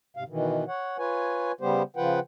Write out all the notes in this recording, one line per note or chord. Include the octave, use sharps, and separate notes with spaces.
G#2 C3 F5
B2 D#3 E3
C#5 F#5
F4 B4 C#5 G#5
C#3 G3 B3 G4 C5
C#3 F3 F4 B4 F#5 G5